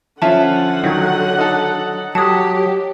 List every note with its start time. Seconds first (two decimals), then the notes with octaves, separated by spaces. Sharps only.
0.22 D3 F3 C#4 F4 E5 F#5 A5
0.84 D#3 F#3
1.38 D#4 A4
2.15 F#3 G4 A5 D#6